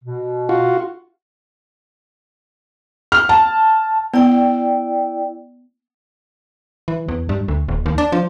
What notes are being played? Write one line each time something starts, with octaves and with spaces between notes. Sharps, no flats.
B2
F4 F#4
F6
A5
B3 E4 D5 G5
E3
E2
G2
D2
D#1
D#2
D4
F3